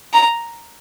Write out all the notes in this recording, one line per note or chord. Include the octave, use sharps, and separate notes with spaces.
A#5